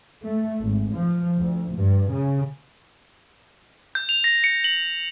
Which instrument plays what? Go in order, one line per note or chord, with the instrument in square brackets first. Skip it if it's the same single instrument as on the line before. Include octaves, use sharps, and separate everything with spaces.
[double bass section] A3
G#1
F3
D2
G2
C#3
[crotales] G6
F7
A#6
C#7
F#7